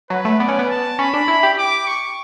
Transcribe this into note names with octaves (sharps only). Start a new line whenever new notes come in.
F#3 B4
A3
B3 D5
C#4
B3
A5
C#4 B5
D4
E4
G4
D6
C#6